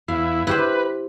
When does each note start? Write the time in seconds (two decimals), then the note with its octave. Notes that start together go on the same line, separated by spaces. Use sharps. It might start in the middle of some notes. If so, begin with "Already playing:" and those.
0.08 E2 E4 F5
0.47 E4 G4 B4 C5